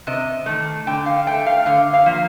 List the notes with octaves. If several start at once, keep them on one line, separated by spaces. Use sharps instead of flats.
C3 D#5
D#3 A3
D3 G5
F5
A3 G5
F5
D3 F5
F5
F3 A#3